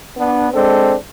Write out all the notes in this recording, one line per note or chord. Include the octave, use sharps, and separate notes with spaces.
B3 D4
G#3 C4 D4 A4